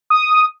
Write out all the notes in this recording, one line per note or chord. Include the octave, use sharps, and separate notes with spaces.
D#6